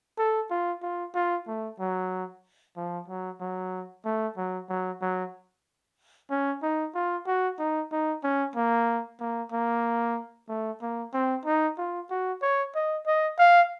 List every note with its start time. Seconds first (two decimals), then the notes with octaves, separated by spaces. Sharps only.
0.18 A4
0.50 F4
0.82 F4
1.15 F4
1.47 A3
1.79 F#3
2.76 F3
3.08 F#3
3.40 F#3
4.05 A3
4.37 F#3
4.69 F#3
5.02 F#3
6.30 C#4
6.63 D#4
6.95 F4
7.27 F#4
7.59 D#4
7.92 D#4
8.23 C#4
8.56 A#3
9.20 A#3
9.52 A#3
10.49 A3
10.82 A#3
11.13 C4
11.45 D#4
11.78 F4
12.10 F#4
12.42 C#5
12.75 D#5
13.07 D#5
13.39 F5